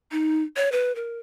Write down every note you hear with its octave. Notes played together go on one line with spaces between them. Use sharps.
D#4
C#5
B4
A#4